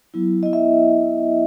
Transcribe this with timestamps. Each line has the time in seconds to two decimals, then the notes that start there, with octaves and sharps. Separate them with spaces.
0.14 F#3 B3 E4
0.43 B3 E4 D#5
0.53 E5